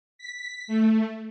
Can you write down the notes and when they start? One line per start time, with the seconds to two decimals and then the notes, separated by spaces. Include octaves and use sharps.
0.18 B6
0.68 A3